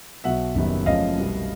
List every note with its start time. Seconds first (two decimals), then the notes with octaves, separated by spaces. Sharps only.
0.24 B1 B2 F#3 E5 F#5
0.55 F#1 F#2 D#3 G3 B3
0.86 F#1 F#2 C#3 F3 A3 D#5 F5
1.18 C2 B2 G3 B3